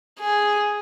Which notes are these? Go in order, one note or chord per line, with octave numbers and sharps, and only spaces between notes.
G#4